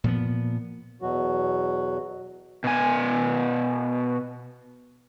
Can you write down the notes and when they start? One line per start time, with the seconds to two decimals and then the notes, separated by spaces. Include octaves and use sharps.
0.04 A#2 F3 B3
1.02 E2 B2 F#3 F#4
2.64 B2 G#5